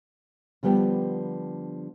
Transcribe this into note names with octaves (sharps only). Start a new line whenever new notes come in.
D3 F3 G3 B3 G4